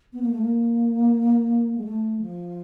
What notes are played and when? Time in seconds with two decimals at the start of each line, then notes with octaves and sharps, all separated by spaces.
0.13 B3
0.22 A#3
0.32 A3
0.42 A#3
1.78 G#3
1.84 A3
2.21 F3